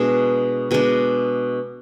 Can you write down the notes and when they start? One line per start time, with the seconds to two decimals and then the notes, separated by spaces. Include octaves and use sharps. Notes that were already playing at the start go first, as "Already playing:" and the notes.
Already playing: B2 G#3 D4
0.71 B2 G#3 D4